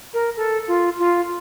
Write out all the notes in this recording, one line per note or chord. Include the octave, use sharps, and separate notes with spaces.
A#4
A4
F4
F4